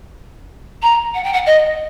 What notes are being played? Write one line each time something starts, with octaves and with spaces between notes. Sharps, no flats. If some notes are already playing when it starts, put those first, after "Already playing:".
A#5
F#5
G5
F#5
D#5